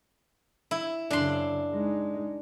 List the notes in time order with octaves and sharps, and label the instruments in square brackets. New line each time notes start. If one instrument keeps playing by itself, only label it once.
[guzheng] E4
[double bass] F#2 C#3 [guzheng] D4 C6
[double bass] G#3 D#4